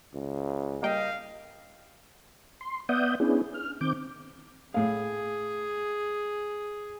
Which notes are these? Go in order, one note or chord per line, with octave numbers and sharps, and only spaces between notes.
C#2
G3 A#3 D#5 F5 G5
C6
B3 D5 E5 F#5 D#6 G6
B3 C#4 D4 E4 G#4
F6
D#3 C4 D6 G6
A2 G#4 F5